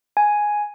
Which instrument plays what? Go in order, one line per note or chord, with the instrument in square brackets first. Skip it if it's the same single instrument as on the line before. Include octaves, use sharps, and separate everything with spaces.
[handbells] G#5